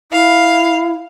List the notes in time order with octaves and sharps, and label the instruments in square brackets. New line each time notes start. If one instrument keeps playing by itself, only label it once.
[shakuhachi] E4 [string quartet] F5